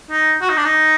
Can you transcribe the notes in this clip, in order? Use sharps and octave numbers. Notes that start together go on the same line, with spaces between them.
D#4
F#4
D#4
D4
D#4